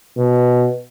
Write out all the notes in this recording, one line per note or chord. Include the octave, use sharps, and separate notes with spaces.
B2